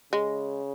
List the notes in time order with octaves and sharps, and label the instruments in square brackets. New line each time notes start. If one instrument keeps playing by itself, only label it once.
[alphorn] C#3 [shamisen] G#3